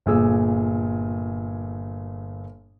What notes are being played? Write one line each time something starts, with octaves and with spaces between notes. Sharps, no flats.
G1 A#2 G#4 E6